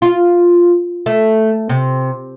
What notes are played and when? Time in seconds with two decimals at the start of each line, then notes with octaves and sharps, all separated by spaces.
0.02 F4
1.06 A3
1.69 C3